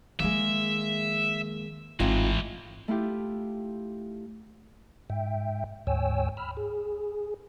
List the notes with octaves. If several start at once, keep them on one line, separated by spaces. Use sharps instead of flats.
D#3 F3 G#3 A#3 E5
G#1 A2 E3 C4 D#4 F4
A3 E4 F4 G4
G#2 E5 G5
D2 G#2 C#5 G5 G#5 E6
B5 E6 F6
G#4